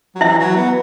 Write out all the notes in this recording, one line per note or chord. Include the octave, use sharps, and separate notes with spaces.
F#3
E3 E4 E5
F#3
B3